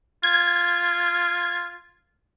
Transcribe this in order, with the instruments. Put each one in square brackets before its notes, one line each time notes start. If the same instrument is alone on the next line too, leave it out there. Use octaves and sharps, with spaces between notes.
[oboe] F4 [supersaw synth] G#6